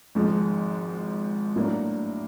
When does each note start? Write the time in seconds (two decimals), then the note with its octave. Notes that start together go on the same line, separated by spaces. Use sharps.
0.15 G#1 G#2 F3 G#3
1.56 A2 F#3 A#3 D4